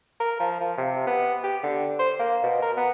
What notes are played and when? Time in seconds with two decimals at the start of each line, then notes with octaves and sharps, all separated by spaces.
0.20 A#4
0.40 F3
0.60 F3
0.78 C3
1.07 B3
1.43 G4
1.63 D3
1.99 C5
2.19 A#3
2.43 B2
2.62 A#4
2.77 B3